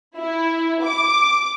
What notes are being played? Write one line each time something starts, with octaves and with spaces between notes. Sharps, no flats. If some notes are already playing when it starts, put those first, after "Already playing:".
E4
D6